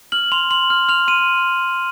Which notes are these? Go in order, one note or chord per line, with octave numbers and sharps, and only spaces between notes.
F6 F#7
C6 F7
C6 F#7
F6
F6 F7
C6 D#7